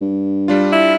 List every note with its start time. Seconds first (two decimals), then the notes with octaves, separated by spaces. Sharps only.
0.01 G2
0.48 G3 D4 F4
0.72 E4